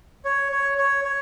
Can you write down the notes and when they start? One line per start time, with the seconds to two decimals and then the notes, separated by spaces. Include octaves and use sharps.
0.25 C#5
0.52 C#5
0.78 C#5
1.04 C#5